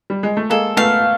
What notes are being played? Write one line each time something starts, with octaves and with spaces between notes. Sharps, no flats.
G3
G#3
A3
G#3 A#3 A4
A3 B3 F5